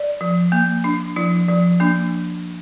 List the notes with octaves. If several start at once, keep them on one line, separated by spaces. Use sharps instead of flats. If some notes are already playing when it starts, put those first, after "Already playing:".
Already playing: D5
F3
A#3
D4
F3 E4
F3
A#3 D4